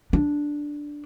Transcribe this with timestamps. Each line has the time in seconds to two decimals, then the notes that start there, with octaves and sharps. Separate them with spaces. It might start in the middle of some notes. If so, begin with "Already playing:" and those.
0.13 D4